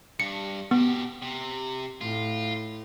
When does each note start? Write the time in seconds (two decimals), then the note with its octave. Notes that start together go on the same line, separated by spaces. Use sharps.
0.20 G2 C#7
0.71 B2 B3 G4
1.22 C3
2.01 A2 F4